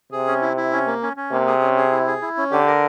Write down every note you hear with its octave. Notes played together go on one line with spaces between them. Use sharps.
C3 G#4
C#4
E4
E4
C#4
A#3
C#4
C#4
C3 A#3
G#4
C#4
G#4
E4
G#4
E4
C#4
D3 G4
A#4